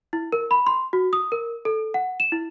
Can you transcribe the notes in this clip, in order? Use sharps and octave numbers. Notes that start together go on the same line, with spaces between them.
E4
A#4
B5
C6
F#4
D#6
A#4
A4
F#5
E7
E4